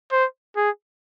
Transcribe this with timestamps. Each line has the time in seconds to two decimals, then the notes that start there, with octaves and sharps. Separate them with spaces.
0.12 C5
0.57 G#4